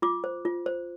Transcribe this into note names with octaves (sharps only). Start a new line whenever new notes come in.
F4 D6
C5
F4
C5